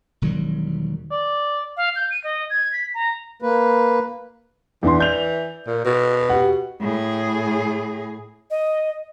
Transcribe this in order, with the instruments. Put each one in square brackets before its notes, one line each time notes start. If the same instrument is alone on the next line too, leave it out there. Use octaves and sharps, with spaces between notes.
[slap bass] E1 D#3 F#3 G3
[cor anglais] D5
[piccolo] F5
G6
D#7
D#5
G#6
B6
A#5
[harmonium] A#3 B4
[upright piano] E2 D4 C6 [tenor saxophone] E3
[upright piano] D5 G6 F7
[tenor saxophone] A#2
B2
[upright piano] G4 F#5
[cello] A2 G#4
[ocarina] D#5